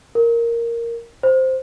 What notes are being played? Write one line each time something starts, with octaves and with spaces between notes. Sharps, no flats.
A#4
C5